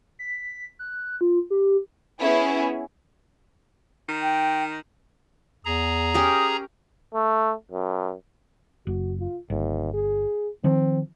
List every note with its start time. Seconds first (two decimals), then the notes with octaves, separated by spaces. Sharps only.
0.19 B6
0.79 F#6
1.21 F4
1.50 G4
2.20 B3 C#4 E4 G#4
4.08 D#3
4.22 G5
5.65 E2 G#4 A#5
6.14 C#4 G4 A#4 D#6
7.14 A3
7.72 F#2
8.87 F#1 F#4
9.20 F4
9.50 G1 D#2
9.93 G#4
10.64 D#3 F3 C4